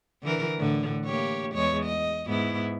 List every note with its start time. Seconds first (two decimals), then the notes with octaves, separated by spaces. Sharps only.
0.23 D3 E3 A#4
0.58 A2 D3
1.05 A#3 G4 C#5
1.54 E2 G#3 C#5
1.86 D#5
2.27 G#2 B3 E4